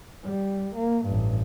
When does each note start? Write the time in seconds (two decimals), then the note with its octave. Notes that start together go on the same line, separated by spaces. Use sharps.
0.24 G3
0.76 A#3
1.06 A1 G2